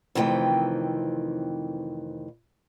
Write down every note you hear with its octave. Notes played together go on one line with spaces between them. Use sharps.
F2 C3 D#3 E3 A3 G5